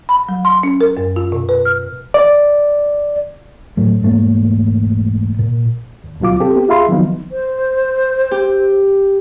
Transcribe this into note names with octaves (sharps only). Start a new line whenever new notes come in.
B5
F#3
C6
C#4
A#4
F#2
F4
B2
B4
F6
D5
A2 F#3 A3
E1 G#2 A3 A#3
A#2
D#2
D2 B2 F#3 F4 D6
C4 G4 A4
B3 G4
F4 G#4 E5 F5 B5 C6
D#3 F3 F#3 B3 D#4
C5
G4